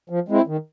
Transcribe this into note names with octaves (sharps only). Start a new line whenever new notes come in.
F3
G#3 C4 E4
D#3